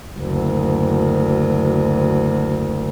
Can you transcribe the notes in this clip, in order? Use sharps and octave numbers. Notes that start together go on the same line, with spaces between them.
F#1 D2